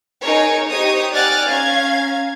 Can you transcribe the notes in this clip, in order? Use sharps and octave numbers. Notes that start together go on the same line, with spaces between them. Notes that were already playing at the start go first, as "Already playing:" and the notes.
D#4 G#4 A#4 C#5
D#4 G4 C5 C#5 D#6
D5 F#5 G#5 F6 F#6 A6
C#4 F5 A#5 G#6